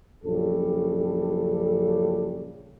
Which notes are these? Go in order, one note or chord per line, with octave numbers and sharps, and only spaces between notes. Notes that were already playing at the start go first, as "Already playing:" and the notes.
A#1 F#2 C#3 G3 A4